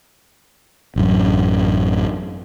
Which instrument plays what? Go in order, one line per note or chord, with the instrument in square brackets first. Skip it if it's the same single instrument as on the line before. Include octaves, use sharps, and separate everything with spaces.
[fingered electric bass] A1 F#2